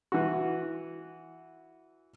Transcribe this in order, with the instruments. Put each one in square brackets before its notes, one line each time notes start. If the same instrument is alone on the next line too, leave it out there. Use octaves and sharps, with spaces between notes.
[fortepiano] E3 F#4